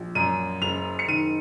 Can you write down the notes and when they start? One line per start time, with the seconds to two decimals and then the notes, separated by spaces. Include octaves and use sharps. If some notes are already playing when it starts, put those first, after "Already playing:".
Already playing: A#1
0.15 F#2 D#7
0.62 F#1 F7
0.99 C#7
1.08 D#3 D#7